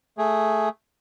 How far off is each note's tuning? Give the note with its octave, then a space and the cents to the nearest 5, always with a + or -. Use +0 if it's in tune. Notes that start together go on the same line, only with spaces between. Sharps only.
A3 +0 G#4 +0